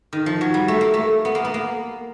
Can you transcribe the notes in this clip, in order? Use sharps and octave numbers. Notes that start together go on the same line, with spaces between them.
D#3
F3
F#3
G3
A3
A#3
A3
B3
A#3
B3
A#3